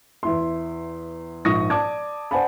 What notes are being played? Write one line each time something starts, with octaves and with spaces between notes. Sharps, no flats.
E2 E4 C6
A#1 G#2 C#6 D#6 A#6
D5 A5 D6 G#6
C5 D5 F#5 G#5 A5 B5